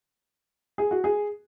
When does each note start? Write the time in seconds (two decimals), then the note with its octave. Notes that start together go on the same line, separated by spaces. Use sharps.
0.78 G#4
0.91 F#4
1.04 G#4